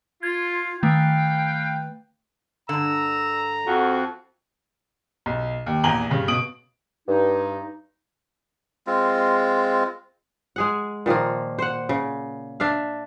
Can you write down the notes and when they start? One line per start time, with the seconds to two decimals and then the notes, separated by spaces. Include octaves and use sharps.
0.23 F4 G#6
0.83 D#3 A3 B4 F5 G5
2.69 G2 D3 A#5 E6
3.67 F2 F#4
5.26 B1
5.66 D#2
5.84 A#1 E2 G#5 A#5 F#7 G7
6.10 G2 C#3
6.28 B2 D#6 D7 F#7
7.08 G2 D#4
8.87 G#3 C4 F4
10.56 G#3 G#4 F#5
11.06 A#2 D#3 F3 A#3
11.59 C5 F#5
11.89 C#3
12.60 D4 E5 F5